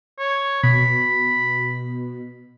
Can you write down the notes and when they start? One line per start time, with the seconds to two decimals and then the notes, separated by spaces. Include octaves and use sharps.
0.19 C#5
0.63 B2 B5